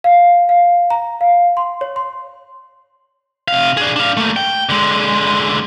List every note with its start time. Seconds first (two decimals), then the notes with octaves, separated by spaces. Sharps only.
0.04 F5
0.49 F5
0.90 A#5
1.21 F5
1.57 C6
1.81 C#5
1.96 C6
3.48 C3 F5
3.77 D4 G#4
3.96 D4 F5
4.17 A3 A#3
4.37 G5
4.69 D3 G#3